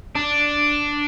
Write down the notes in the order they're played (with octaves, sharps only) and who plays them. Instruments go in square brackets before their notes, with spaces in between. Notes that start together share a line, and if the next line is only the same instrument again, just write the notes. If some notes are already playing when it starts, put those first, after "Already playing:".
[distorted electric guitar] D4